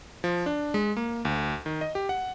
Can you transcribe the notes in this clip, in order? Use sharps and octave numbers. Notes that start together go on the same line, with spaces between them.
F3
D4
G#3
A#3
D2
D#3
D#5
G4
F#5